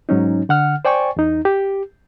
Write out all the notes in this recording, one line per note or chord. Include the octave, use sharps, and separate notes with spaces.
G#2 F#3 C#4 D#4
D3 F#5 F6
C5 D5 G5 G#5 C#6
E2 D#4
G4